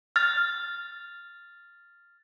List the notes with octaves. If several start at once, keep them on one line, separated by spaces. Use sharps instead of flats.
F6 A6